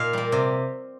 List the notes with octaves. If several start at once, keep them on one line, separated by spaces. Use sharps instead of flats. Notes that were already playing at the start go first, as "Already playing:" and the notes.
Already playing: A#2 D#5 F5
G3 A#3
C3